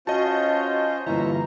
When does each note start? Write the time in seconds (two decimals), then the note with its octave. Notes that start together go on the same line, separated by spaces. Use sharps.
0.07 C#4 F4 F#4 C5 D#5 A5
1.06 G1 A#2 E3 E5 A#5 C#6